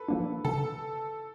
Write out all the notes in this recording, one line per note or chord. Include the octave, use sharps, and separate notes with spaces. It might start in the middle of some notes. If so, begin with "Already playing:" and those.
Already playing: A4 B4
F3 A#3 D4
C#3 A4